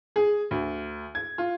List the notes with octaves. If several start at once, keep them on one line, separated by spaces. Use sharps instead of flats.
G#4
D2
G#6
F4